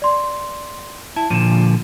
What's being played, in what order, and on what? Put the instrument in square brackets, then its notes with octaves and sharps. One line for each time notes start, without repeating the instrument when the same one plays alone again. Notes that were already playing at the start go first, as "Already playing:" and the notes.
[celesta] D5 C6
[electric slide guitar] E4 [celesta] A5
[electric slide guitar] A#2 D3 F3 [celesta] D#7 E7